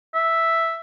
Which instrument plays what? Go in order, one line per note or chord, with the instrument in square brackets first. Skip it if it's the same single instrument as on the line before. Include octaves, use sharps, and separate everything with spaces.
[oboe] E5